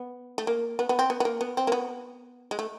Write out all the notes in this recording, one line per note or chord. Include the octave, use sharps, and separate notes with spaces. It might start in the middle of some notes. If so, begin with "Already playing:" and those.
Already playing: B3
A3
A#3
B3
B3
C4
B3
B3
A#3
B3
C4
A#3
B3
G#3
A3